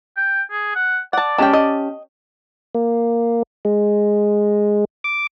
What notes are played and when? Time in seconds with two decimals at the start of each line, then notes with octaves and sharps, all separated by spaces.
0.17 G5
0.51 G#4
0.75 F#5
1.13 D5 F#5 A5
1.38 G#3 C#4 G4 G5 A5
1.53 D#5
2.75 A#3
3.65 G#3
5.04 D6